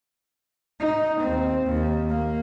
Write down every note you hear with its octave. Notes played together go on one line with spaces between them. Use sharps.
D#4
D#2 C4
D#2
A#3